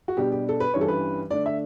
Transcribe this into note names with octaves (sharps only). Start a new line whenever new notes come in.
F#4
B2 G3 D4 G4
G4
A4
B4
G2 E3 G3 C#4 C#5
A4
B4
D3 A3 D4 D5
E5